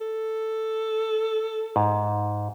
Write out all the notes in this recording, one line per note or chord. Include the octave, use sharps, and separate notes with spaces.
A4
G#2